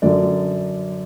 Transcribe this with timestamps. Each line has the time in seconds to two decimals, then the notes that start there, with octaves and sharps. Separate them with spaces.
0.02 F#2 D3 F#3 D5